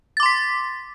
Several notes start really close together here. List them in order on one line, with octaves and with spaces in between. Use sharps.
A6 D6 C6 B6